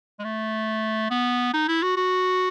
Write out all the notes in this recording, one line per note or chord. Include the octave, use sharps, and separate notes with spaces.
G#3
A3
B3
D#4
E4
F#4
F#4